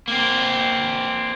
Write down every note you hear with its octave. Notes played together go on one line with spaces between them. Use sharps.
A#3 C4